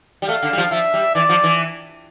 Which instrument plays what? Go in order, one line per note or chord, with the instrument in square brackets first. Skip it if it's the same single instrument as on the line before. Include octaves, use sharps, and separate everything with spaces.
[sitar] G3
[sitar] A3 [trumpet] F5
[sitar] D3
G3
F3
[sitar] F3 [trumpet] E5
[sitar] G3
[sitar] E3 [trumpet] D5
[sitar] F3
E3